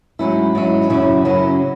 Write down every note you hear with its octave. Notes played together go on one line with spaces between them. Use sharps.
G#2 F#3 C#4 E4
G#2 F#3 C#4 E4
F#2 C#3 F#3 C#4 E4
F#2 C#3 F#3 C#4 E4